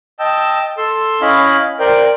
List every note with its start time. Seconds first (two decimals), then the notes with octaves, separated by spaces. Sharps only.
0.19 D#5 G5 A5 E6
0.78 A4 C6 E6
1.21 C#4 E4 D#5 F5 B5
1.79 A#4 C5 D5 G5